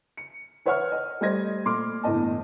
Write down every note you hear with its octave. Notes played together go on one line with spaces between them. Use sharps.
C#7
B4 C#5 E5 F#5 C#6 F6
D#5
G3 A3 C5 D#5 G#6 A#6
A#2 A3 C6 D6 F6
G1 E2 A2 D#5 A5